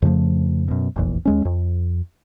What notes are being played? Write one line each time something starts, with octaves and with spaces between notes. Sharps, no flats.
F2 C#3 F3 A3
F#2 B2
F1 A#1 E2
D#2 G#3 C#4
F2